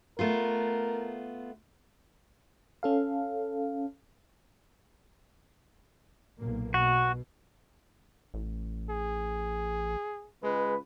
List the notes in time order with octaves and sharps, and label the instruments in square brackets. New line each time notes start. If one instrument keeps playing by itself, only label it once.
[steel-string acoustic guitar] A3 B3 F4 [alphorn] A#4
[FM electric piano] C#4 A4 F5
[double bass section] B1 A#2 A#3
[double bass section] B2 [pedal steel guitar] F#4
[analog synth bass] A1
[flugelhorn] G#4
[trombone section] C#2 B4 [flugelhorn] G#3